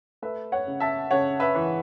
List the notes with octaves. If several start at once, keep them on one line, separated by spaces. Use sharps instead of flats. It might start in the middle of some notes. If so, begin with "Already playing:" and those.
A3 B4 E5
C#5 F#5
C#3
E5 A5
C#3 C#5 F#5
B4 E5
E3